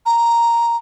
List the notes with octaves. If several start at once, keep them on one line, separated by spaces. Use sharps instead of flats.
A#5